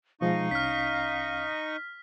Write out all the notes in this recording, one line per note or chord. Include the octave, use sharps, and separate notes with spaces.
B2 F3 G#3 D#4 D#5 F5 C#6
C2 C#4 F6 B6